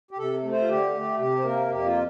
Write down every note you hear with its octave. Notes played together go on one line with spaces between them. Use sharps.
G4
C3 A4
A3
C5
F4
D3 G4
A3
C3 G4
C5
A#3 A#4
F2 G4
F4